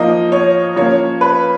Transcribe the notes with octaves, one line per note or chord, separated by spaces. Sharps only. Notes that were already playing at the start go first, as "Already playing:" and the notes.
Already playing: F3 A#3 D#4 D#5
C#5
F3 A#3 C#4 C#5
B4